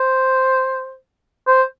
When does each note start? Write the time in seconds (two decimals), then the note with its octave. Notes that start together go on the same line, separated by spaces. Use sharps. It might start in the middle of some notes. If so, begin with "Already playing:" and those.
Already playing: C5
1.47 C5